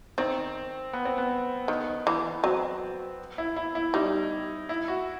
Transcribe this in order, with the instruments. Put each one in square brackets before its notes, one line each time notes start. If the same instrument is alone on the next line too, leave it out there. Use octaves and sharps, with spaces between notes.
[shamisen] D#3 [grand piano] C4
[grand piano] B3
C4
B3
[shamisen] D#3
E3
[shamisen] F#3 [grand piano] C4
[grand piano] E4
E4
E4
[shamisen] G3 [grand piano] D#4
[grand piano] E4
F#4